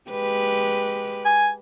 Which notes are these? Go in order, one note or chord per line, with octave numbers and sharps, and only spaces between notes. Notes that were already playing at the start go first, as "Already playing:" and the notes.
G#3 G4 B4
G#5